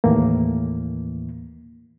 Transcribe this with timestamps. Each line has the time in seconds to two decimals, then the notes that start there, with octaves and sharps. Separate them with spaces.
0.04 D#2 A2 E3 A#3